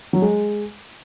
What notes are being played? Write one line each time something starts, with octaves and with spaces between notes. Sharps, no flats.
F#3
G#3